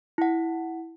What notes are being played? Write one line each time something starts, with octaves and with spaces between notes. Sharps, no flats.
E4 F#5